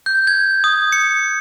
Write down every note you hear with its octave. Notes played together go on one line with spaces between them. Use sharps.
G6
G#6
D#6
C#7